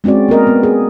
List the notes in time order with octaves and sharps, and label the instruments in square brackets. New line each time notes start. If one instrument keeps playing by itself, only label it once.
[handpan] G#3 C4 C#4 F#4 D5
A#3 B3 A#4 D#5
B3
G#4